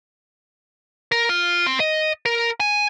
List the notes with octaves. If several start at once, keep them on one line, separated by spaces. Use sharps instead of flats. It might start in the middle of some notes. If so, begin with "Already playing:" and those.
A#4
F4
C4
D#5
A#4
G#5